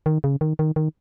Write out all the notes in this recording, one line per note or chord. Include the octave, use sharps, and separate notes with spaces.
D#3
C#3
D#3
D#3
D#3